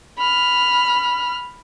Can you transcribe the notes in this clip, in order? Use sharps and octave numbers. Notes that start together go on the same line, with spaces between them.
B5 F6